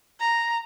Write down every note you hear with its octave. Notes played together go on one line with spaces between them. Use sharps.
A#5